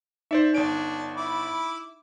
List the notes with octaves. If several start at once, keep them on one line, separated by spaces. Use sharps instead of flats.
D#4 C5 D5 E5
G1 D4 D7
E4 B5 D6